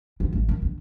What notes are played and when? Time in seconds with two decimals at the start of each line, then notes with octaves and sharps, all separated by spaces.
0.20 D3
0.33 A1
0.49 A#2
0.62 D3